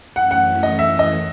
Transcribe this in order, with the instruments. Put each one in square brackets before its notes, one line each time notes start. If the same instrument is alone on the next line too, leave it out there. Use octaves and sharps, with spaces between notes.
[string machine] F#2 E3 A3 C#4 [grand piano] F#5
[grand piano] F#5
D#5
E5
D#5